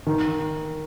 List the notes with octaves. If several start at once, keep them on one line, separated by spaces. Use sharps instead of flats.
D#3